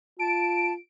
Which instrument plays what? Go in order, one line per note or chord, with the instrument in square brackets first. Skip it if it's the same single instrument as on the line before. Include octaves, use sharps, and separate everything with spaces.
[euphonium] F4 [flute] A5 [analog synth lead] D7